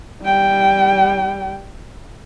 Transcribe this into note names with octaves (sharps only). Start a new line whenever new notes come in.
G3 G5